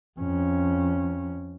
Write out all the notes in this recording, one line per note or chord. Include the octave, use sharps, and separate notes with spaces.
F2 C#4